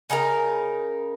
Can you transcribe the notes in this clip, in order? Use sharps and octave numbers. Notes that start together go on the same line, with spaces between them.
C#3 D#4 A4 A#4